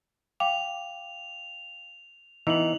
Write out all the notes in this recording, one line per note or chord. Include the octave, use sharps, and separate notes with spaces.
F5 G5 D6 F7
E3 B3 D#4 F7 F#7